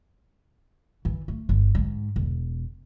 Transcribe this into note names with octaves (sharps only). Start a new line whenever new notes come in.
E3
A3
G1
G#2
E1